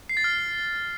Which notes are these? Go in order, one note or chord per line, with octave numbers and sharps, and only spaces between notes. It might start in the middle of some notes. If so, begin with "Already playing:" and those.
C7
A6
F6